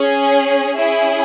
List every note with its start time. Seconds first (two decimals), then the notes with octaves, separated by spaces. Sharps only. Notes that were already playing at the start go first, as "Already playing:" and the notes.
Already playing: C#4 G#4
0.75 C#4 E4 G#4 E5